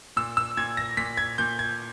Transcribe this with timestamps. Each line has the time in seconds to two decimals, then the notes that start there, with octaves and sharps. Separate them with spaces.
0.17 A#2 E6
0.37 E6
0.57 A#2 G#6
0.77 A#6
0.97 A#2 B6
1.17 G#6
1.38 A#2 G6
1.59 G#6